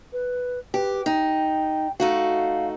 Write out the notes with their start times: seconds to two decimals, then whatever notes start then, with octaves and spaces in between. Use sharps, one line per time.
0.13 B4
0.74 G4 B4
1.06 D#4 G5
2.00 A3 D#4 F#4 F5